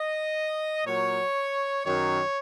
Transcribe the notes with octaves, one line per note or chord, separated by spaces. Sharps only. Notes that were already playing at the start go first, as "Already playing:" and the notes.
Already playing: D#5
A#2 F#3 C#5
F#2 D#3 F#3 C#5